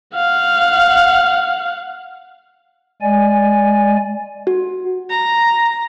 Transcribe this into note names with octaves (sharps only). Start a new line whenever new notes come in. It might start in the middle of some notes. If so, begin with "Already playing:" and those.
F5 F#5
G#3 D5 G#5
F#4
A#5